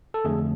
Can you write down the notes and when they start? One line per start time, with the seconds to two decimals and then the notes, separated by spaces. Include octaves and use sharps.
0.14 A4
0.24 F2 D3 A3 G#4